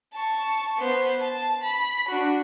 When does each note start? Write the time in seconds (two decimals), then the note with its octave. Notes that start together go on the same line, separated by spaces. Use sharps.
0.15 A5 C#6
0.78 B3 C5
1.21 A5
1.63 B5
2.09 D4 F#4